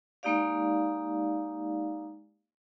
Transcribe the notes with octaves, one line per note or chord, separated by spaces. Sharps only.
G#3 A#3 D#4 G4 D5 F5